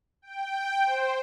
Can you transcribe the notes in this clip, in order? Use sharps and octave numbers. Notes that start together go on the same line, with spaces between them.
G5
C5